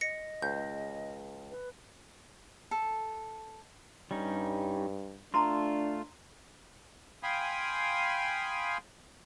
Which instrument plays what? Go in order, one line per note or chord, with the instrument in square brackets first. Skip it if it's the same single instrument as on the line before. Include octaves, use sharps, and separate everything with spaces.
[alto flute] D#5 [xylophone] A#6 C#7
[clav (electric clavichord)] C#2 [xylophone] G6
[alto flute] B4
[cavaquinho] A4
[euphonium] G2 [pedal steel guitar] G3 C#4 D#4
[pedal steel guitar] A3 F4 [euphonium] D4 [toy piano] A#5 C6
[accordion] F5 G5 G#5 B5 C6 D#6